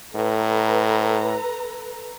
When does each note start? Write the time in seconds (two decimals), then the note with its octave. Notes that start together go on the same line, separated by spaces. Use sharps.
0.15 A2 A4 B4 A#5